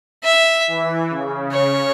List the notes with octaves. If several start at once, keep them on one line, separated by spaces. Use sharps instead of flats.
E5
E3
C#3
C#5